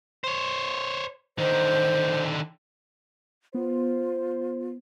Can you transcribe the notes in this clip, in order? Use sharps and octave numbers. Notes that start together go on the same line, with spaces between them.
C5 C#5
D3 D#3 C5
B3 F4 C5